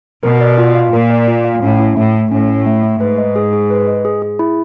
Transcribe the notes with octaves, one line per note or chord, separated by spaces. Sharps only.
B2 A#4
D5
F4
F5
A#2 A#4
D5
F4
F5
A2 C#4
E4
A2 A3
A3
A2 C#4
E4
A3
A3
G#2 B4
D#5
G#4
G#4
B4
D#5
G#4
G#4
E4